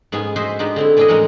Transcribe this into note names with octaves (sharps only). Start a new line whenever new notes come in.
G#2 B3 C#4 G#4 G#5
F#4 G#4 C5 D#5 E5
G#3 B3 D4 D#4 G4
D3 C4 E4
E2 E3 D4 E4 G#4 D#5
A2 G#3 C#4 F#4 A#4 F#5